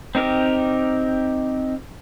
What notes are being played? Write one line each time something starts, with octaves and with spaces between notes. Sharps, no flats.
C4 D#4 G4 A#4